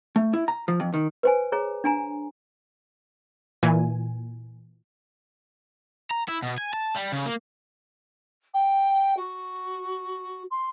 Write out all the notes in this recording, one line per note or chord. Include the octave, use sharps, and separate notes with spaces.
A3
E4
A#5
F3
F2
D#3
B4 C5 G#5
G#4 C#5 A#5
D4 G#5 A#5
A#2 E3 G#5
A#5
E4
B2
G#5
A5
G3
C#3
A#3
G5
F#4
C6